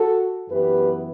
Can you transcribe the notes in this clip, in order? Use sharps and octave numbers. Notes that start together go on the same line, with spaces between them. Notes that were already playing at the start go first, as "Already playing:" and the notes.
Already playing: F#4 A4
F#2 E3 B3 G4 B4